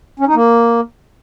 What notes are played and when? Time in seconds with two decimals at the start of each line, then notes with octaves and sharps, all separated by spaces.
0.20 C#4
0.27 D#4
0.35 A#3